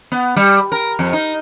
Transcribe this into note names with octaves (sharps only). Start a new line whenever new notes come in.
B3
G3
A#4
F2
D#4